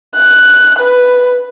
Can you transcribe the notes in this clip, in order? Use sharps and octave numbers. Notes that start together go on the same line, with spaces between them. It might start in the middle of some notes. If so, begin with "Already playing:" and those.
F#6
B4